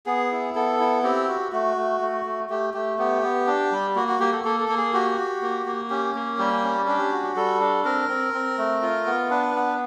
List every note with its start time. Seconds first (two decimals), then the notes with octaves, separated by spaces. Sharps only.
0.06 B3 G#4
0.31 E4
0.55 B3 A4
0.80 E4
1.03 C4 G4
1.28 F#4
1.52 A3 F#4
1.77 A3
2.01 A3
2.25 A3
2.50 A3 G4
2.74 A3 G4
2.99 B3 G4
3.23 B3
3.47 D4
3.72 G3
3.96 A#3 F#4
4.08 F#4
4.20 A#3 G4
4.32 A4
4.45 A#3 A4
4.60 A4
4.68 A#3
4.77 G#4
4.93 F#4 G4
5.18 F#4
5.42 A#3
5.66 A#3
5.90 C#4 G4
6.15 A#3
6.39 G3 G4
6.63 C#4
6.87 D4 G4
7.12 F#4
7.36 G3 A4
7.60 D4
7.85 C4 A#4
8.09 C4
8.33 C4
8.58 A3
8.82 F4
9.06 B3
9.30 D4 B4
9.55 B3